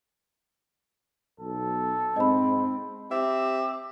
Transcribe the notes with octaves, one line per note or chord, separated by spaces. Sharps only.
B1 A4
G#2 C4 D#5 B5
C4 G4 E5 D6